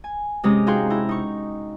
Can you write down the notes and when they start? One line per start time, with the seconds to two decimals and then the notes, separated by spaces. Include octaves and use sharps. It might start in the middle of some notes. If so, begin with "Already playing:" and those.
0.04 G#5
0.44 C3 G#3 C#4 G4 A#5 D#6
0.67 D#4 F#4 G#4 F5 G5 C6
0.90 E4 G5 A#5
1.09 D#4 C#6